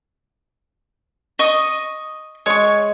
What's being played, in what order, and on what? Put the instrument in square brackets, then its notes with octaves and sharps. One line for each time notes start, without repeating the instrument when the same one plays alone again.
[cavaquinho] D#5 C#6 D#6
[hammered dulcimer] G#3 [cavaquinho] C#5 C#6